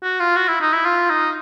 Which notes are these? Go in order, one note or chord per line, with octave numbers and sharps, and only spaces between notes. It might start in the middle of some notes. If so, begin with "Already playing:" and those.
F#4
F4
F#4
E4
D#4
E4
F4
D#4